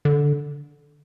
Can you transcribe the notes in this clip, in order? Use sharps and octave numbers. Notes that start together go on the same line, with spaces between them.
D3